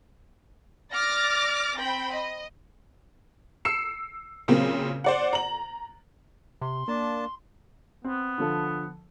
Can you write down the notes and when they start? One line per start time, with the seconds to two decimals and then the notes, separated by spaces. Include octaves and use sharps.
0.93 D5 D6 F6 A6 A#6
1.76 C4 G5 B5
2.12 D#5
3.65 E6 C7 C#7 E7
4.48 A#2 C#3 F#3 A#3 C4
5.04 C5 D5 F#5
5.33 A#5 F#7
6.61 C3 C6
6.88 A#3 D4 A5
8.04 B3 C4
8.38 D3 F3 A4